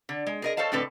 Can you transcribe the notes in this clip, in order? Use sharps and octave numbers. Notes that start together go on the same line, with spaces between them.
D3
G#3
G#4 A#4 D#5
A4 C5 C#5 F5 A5
A2 D3 C4 A4 B4